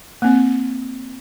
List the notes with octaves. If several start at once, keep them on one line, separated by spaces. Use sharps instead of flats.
A#3 C4